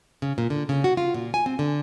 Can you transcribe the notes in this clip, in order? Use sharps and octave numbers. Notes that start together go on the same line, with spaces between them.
C#3
A#2
D3
C#3
F#4
F4
A#2
G#5
C4
D3